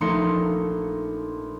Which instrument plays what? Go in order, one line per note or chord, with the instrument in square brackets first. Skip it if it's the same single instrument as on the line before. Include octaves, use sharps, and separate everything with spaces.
[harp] A#1 A3 D#4 C6 C#7